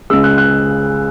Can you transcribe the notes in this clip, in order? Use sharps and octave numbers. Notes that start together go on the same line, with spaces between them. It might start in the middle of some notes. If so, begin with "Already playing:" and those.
C#2 C#3 G#3 E6
F#6
F#6